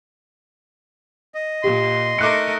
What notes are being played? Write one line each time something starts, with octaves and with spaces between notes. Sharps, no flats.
D#5
A#2 G4 C6
A3 D#4 A#4 D6 F#6 C#7